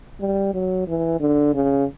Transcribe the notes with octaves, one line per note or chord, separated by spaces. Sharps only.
G3
F#3
E3
D3
C#3